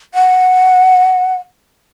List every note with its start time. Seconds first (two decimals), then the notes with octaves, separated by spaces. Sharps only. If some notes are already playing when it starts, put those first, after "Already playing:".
0.14 F#5